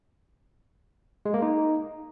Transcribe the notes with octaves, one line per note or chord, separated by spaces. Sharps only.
G#3
A#3
D#4